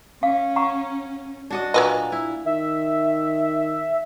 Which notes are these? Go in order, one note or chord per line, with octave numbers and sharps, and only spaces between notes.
C#4 F5
F#5 A#5 C#6
D4 F#4 D#5
A#2 F#3 A#3 B4 D#5
E4
D#3 E5